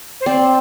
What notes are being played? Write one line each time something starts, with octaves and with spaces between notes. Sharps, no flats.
C5
C4 D5